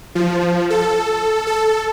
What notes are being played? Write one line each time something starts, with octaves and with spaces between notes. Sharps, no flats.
F3
A4
A4